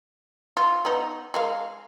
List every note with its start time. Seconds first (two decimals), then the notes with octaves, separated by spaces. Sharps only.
0.57 F4
0.85 B3 D#4
1.34 G#3 A#4 F5